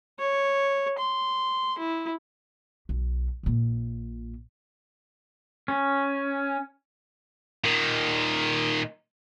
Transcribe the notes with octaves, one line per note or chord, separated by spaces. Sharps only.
C#5
C6
E4
B1
A#1 A#2
C#4
A#2 D#3